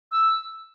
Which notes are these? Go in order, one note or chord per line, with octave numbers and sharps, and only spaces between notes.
E6